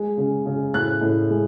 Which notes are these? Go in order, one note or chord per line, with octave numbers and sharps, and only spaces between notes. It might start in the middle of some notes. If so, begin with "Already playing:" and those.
Already playing: G#3
C#3
C#3
A2 F#6
A2
G#3